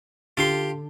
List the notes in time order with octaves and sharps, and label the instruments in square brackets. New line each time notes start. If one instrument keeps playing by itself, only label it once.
[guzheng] D3 [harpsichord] F4 G4 C6